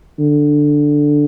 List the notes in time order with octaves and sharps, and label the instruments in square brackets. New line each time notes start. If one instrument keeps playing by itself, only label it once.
[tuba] D3